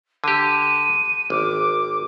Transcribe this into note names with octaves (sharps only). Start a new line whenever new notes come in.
D3 G4 D#7
G#1 D6